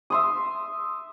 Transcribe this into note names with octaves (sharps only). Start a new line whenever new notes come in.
E5 C6 D#6